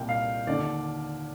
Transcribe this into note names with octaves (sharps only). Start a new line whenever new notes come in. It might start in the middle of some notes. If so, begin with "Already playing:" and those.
Already playing: C2 A#2 G5
F5
D#2 D3 D5